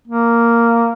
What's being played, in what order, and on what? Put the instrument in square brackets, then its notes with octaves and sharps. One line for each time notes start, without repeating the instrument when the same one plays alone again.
[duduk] A#3